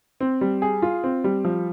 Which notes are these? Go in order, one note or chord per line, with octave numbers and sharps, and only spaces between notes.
C4
G3
G#4
F4
C4
G3
F3